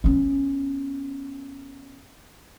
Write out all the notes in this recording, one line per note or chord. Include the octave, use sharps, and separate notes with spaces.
B3 C#4